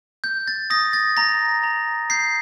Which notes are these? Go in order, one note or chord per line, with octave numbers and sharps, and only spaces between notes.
G6
A6
D#6 A#6
A6
A#5 A#6
A#5
G6 C7